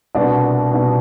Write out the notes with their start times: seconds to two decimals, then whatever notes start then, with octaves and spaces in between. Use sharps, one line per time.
0.15 C2 B2 D4 F#4
0.71 C2 B2